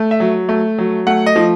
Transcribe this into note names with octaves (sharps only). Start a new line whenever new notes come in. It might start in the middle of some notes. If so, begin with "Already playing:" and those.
Already playing: A3
E5
F#3
A3
F#3
A3 F#5
D#5
F3